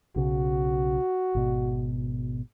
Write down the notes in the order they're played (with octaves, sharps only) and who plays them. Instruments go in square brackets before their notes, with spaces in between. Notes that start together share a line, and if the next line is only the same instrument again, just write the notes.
[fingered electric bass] B1 C#3 [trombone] F#4
[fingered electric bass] G#1 B2